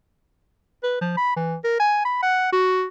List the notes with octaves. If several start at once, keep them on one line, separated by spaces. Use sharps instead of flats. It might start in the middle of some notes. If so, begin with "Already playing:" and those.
B4
F3
B5
E3
A#4
G#5
B5
F#5
F#4